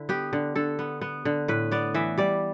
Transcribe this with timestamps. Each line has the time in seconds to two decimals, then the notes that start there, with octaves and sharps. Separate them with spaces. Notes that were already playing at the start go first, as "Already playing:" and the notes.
Already playing: D3 E4
0.09 B3 G4
0.33 D3
0.56 D3 A4
0.79 B3
1.01 B3
1.25 D3
1.48 A2 B4
1.72 B3 D5
1.94 E3 E5
2.18 G3 D5